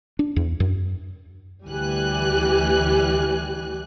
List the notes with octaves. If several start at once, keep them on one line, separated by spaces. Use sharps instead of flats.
D4
E2
F#2
D2 E3 G3 G4 G#5 F#6